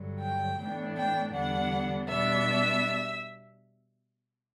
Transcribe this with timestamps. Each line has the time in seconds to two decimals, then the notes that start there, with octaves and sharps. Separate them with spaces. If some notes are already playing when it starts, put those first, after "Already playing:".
Already playing: G2 D3 F#3
0.21 G5
0.59 A2 E3 B3 D4
0.97 G5
1.34 E2 D3 G3 B3 D4 F#5
2.09 B2 G3 B3 D4 E5